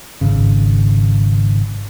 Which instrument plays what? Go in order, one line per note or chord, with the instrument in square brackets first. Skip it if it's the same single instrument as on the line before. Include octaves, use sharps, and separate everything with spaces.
[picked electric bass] G#1 C#3